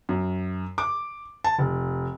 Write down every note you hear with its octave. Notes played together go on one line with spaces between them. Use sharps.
F#2
D6
A5
F1